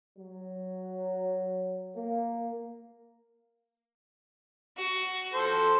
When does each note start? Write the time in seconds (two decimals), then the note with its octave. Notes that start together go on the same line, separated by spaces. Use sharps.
0.19 F#3
1.96 A#3
4.77 F#4
5.34 A4 C5